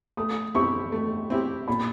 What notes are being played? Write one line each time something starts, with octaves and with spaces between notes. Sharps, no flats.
A3 D#6
C4 E4 G4 C#6
A3
C4 E4 G4
A#2 B5